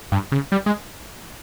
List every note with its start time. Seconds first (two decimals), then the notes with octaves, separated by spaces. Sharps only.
0.12 G2
0.32 C#3
0.52 G3
0.66 G#3